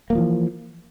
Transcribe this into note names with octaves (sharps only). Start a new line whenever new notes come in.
E3 F3 A3 A#3